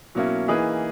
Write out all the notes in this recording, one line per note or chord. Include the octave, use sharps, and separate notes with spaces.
B2 F#3 A#3 C#4 E4
E3 A#3 D#4 G#4 B4